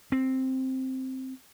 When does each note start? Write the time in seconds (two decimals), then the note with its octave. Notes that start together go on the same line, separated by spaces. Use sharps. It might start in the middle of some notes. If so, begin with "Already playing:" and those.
0.12 C4